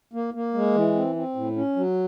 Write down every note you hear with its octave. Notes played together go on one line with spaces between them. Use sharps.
A#3
A#3
G#3
E3
C4
C4
A2
C#4
F#3